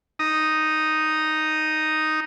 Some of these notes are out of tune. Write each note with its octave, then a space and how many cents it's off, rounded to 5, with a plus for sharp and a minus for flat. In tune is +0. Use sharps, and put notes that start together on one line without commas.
D#4 +0 D#6 +0